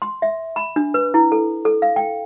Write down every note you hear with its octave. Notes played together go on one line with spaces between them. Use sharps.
C6
E5
B5
D4
B4
E4
A4
A4
F5
G5